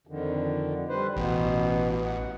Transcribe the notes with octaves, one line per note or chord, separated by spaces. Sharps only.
F2 D3 D#3
G3 B4 C5
A1 B2 B3
F#5